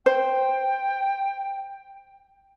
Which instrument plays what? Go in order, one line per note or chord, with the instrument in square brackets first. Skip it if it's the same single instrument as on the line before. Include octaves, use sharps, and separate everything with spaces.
[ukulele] C5 [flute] G5